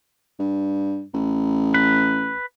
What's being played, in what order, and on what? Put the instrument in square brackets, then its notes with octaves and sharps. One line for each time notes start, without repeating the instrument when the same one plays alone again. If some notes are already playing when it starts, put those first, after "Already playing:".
[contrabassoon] G2
A1
[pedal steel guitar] B4